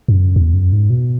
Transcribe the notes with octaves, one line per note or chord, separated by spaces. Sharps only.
F#2
E2
F#2
G#2
B2